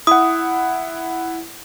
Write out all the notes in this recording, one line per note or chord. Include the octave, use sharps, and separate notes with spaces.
E4 F#5 D#6